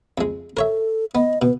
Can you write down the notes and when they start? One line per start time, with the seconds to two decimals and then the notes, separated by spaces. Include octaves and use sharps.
0.18 F2 G#3
0.57 A4 A#4 C#5 E5
1.15 B3 D#5
1.42 B2 B4